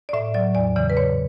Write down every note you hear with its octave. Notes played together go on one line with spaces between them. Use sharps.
D5
A2 E5
F#3 D5
E2 D5
C#3 E3 D5
B4
G#2 C#5